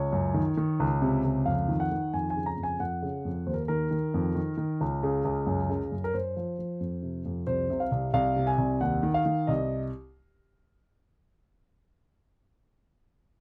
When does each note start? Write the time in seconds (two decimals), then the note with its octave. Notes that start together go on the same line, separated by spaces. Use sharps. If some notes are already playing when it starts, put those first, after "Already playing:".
Already playing: C#2 C#5
0.12 F#2
0.34 D#3
0.57 D#3
0.80 C#2
1.02 C3
1.25 C#2
1.46 F2 F5
1.68 D#3
1.80 F#5
1.91 D#3
2.13 F2 G#5
2.30 G#5
2.36 C#3
2.46 A#5
2.57 F2
2.63 G#5
2.79 F2 F#5
3.02 C#3
3.25 F2
3.46 D#2 C5
3.54 A#4
3.68 D#3 A#4
3.91 D#3
4.14 F2
4.35 D#3
4.57 D#3
4.81 C#2
5.03 C#3
5.25 C#2
5.46 F#2
5.69 C#3
5.92 F#2
6.04 A#4
6.14 F#2 C5
6.37 F3
6.59 F3
6.80 F2
7.03 C3
7.25 F2
7.47 C2 C5
7.70 C3
7.80 F5
7.92 C2
8.14 C2 F5
8.36 C3
8.47 G#5
8.58 C2
8.81 D#2 F#5
9.03 D#3
9.14 F5
9.26 D#3
9.47 C2 D#5